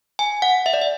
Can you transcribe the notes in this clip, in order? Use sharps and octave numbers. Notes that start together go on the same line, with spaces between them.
G#5
F#5
E5
D5
E5